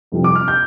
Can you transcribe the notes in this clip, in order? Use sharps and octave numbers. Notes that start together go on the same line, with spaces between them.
F2 C3 G3 C4 F4
D6
F6
G6